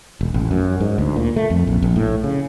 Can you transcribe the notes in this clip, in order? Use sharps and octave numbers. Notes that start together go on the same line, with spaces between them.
E1
A1
F#2
G#2
D2
A#2
A3
F2
A#1
A#1
A2
C#3